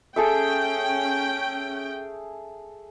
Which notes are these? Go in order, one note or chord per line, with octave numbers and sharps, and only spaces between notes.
C#4 G#4 A4 E5 G5